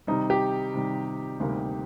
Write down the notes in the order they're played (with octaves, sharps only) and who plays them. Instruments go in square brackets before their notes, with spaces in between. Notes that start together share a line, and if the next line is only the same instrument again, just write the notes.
[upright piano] C3 D#3 G3 [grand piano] D#4
[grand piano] G4
[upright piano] C3 D#3 G3
D2 C3 D#3 G3 A#3